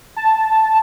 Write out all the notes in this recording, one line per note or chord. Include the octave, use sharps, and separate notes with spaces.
A5